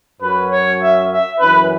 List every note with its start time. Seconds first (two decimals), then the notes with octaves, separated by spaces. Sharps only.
0.21 F#2 F#3 C#4 B4
0.51 C#5
0.81 E5
1.11 E5
1.40 F#2 E3 C#4 B4